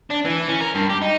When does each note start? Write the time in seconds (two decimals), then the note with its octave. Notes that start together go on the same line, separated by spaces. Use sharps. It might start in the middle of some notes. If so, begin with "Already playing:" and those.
0.11 D4
0.26 E3
0.49 C#4
0.61 A#4
0.75 G2
0.90 G4
1.02 D#4